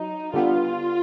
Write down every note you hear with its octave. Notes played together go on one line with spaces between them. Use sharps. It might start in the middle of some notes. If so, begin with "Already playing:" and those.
Already playing: F#3 D#4
D3 G3 B3 F4